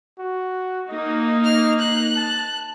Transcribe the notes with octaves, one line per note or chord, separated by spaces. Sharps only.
F#4
A#3 D#4 D#5
F6
F#6
A5